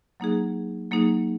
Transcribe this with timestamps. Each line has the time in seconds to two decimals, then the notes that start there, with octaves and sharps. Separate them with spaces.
0.20 F#3 A#3 D#4 G#4
0.91 F#3 A#3 D#4 G#4